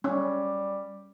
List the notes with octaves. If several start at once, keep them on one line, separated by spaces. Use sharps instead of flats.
G3 C#4